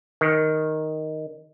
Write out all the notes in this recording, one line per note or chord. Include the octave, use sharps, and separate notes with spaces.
D#3